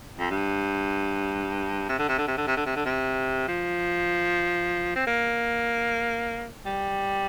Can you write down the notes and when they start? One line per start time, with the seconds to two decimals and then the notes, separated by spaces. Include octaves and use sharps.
0.19 F2
0.30 G2
1.89 C3
1.99 D3
2.09 C3
2.18 D3
2.28 C3
2.38 D3
2.48 C3
2.57 D3
2.66 C3
2.76 D3
2.86 C3
3.48 F3
4.96 C4
5.07 A#3
6.66 G3